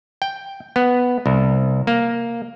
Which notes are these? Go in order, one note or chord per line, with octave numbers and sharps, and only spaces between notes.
G5
B3
C2
A#3